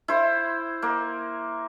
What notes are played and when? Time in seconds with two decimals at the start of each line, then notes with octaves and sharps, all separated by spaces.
0.08 E4 C5
0.82 A#3